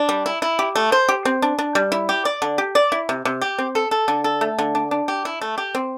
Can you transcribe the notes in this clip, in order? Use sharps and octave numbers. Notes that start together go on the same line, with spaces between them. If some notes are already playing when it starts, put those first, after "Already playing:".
Already playing: D4
G3
E4
E4
G4
A3
C5
G4
C4
D4
D4
G3
E4
G4
D5
D3
G4
D5
E4
C3
C3
G4
C4
A4
A4
D3
A4
A3
D3
D4
D4
G4
E4
A3
G4
C4